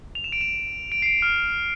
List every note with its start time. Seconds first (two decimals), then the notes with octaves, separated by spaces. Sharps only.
0.15 F7
0.24 E7
0.32 D7
0.41 E7
0.92 D7
1.02 C7
1.06 D7
1.22 F6